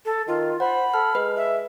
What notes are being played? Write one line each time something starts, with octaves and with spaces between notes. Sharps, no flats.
A4
D#3 F4
C5 F#5 B5
A4 F6
G#3 B4
E5